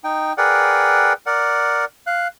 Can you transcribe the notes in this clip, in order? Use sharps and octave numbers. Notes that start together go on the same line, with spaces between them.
D#4 G5
G#4 A#4 B4 D5 F#5 G5
A#4 D5 F#5
F5 F#6